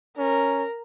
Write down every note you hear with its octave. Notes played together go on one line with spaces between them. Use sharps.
C#4 A#4